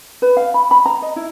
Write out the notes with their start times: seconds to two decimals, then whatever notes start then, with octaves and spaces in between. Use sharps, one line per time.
0.22 B4
0.37 F5
0.54 B5
0.71 B5
0.86 A#5
1.02 D#5
1.16 E4